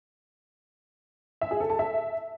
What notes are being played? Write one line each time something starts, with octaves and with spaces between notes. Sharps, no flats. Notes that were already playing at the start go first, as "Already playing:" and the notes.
E5
G#4
A4
A5
E5